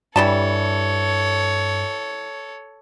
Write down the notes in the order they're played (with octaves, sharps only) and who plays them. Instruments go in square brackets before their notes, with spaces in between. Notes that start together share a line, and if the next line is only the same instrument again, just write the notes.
[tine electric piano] G2 [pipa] E3 G3 A5 [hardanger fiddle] A4 C#5